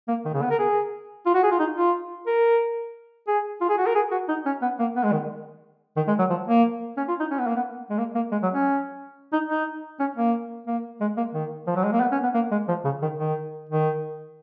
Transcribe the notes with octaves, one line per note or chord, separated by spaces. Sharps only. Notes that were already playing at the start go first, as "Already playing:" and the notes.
A#3
D#3
C#3
B3
A#4
G#4
F4
F#4
G#4
F4
D#4
F4
A#4
G#4
F4
G#4
F#4
A#4
G#4
F#4
D#4
C#4
B3
A#3
B3
G#3
D#3
D#3
G#3
F#3
F3
A#3
C#4
F4
D#4
C#4
B3
A#3
B3
G#3
A#3
A#3
G#3
F#3
C#4
D#4
D#4
C#4
A#3
A#3
G#3
A#3
D#3
F3
F#3
G#3
A#3
B3
C#4
B3
A#3
G#3
F3
C#3
D#3
D#3
D#3